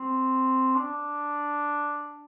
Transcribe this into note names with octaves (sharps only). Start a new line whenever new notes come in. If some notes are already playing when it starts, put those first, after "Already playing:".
Already playing: C4
D4